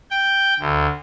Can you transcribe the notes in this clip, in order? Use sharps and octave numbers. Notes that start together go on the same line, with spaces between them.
G5
D2